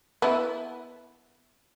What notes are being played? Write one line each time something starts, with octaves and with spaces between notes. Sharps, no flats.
B3 E4